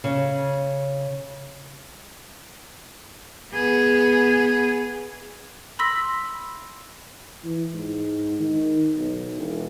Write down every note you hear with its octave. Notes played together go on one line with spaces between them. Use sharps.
C#3
B3 G#4
B5 C6 E6 A#6 B6
E3
G#2
D#3
B1
E1